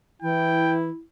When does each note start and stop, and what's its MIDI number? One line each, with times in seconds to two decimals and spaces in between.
0.22 0.90 52
0.22 1.02 64
0.22 0.75 79